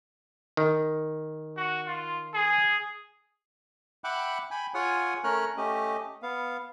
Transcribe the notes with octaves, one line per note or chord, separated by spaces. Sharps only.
D#3
F#4
F4
G#4
E5 F#5 G5 B5 D6 F#6
G5 G#5 B5
F4 G#4 C#5 F#5 G#5 D#6
A3 C#4 A#4 C#5 F6 F#6
A3 C#4 G4 D#5
B3 F5